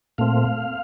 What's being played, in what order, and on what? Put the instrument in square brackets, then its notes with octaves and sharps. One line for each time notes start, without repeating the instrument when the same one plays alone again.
[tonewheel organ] A#2 A3 C4 F5